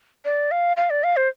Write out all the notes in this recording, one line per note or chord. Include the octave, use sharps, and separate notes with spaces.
D5
F5
F5
D5
F5
C5